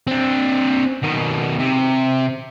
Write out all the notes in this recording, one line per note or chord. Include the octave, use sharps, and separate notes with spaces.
C4 D4
B2 D#3
C3